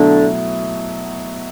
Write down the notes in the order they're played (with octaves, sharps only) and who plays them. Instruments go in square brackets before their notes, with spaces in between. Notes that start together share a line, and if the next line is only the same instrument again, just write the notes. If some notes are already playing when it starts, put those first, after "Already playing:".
Already playing: [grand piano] B2 F#3 A3 E4 [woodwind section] D3 D4